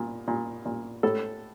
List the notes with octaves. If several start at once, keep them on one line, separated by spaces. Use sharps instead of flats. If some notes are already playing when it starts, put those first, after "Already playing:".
Already playing: A#2
A#2
A#2
A2 A4